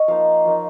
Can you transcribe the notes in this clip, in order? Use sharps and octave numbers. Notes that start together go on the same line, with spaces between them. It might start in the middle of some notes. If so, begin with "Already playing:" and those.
Already playing: C#5 D#5
F3 A#3 D#4 F5
F3 A#3 D#4